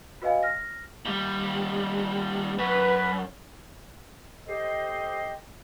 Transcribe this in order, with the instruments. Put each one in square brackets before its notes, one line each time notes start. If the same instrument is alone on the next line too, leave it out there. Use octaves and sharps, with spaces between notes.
[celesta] F#4 B4 D#5 F5 G#5
F6 A#6
[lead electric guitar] D#2 G3
[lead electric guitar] F#2 [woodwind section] B4
[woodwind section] G4 A4 C5 D#5